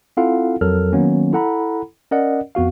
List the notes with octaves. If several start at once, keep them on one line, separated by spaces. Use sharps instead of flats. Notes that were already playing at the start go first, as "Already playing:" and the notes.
C4 E4 F4 A4 F5 F#5
F2 F#3 A4 A#4 F6
D#3 F#3 A#3 B3 C#4
E4 A4 F#5 A#5 B5
C#4 A#4 D5 D#5 F#5
F2 B3 F#4 F5